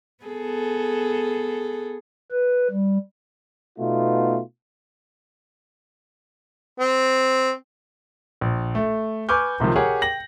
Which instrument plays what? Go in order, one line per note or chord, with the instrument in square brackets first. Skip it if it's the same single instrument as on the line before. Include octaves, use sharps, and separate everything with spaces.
[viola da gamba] B3 G#4 A4
[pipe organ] B4
G3
[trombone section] B2 A3 B3 D#4 F4
[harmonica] C4
[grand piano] A#1
A3
B4 G#5 C#6 D6 F6 G6
C#2 C3 D#3 F3
G4 G#4 A#4 C#5 F#5
G5 A#6 F#7